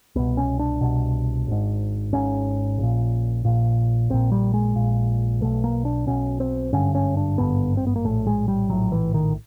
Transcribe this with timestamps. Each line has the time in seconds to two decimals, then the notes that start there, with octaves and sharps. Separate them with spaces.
0.15 C2 B2 B3
0.37 C#4
0.59 D4
0.81 C2 B2
1.47 G#1 G#2
2.12 G#1 G#2 C#4
2.78 A#1 A#2
3.45 A#1 A#2
4.10 A#1 A#2 C4
4.32 G3
4.54 G#3
4.76 A#1 A#2
5.41 B1 B2 A3
5.64 A#3
5.85 D4
6.07 B1 B2 C#4
6.40 C4
6.73 G#1 G2 D3 C#4
6.95 C#4
7.17 D4
7.38 G#1 G2 D3 B3
7.77 C4
7.87 B3
7.96 A#3
8.05 A#1 A2 A3
8.27 G#3
8.48 G3
8.70 A#1 A2 F#3
8.92 E3
9.14 D#3